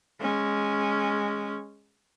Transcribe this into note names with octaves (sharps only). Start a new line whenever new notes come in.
G#3 C#4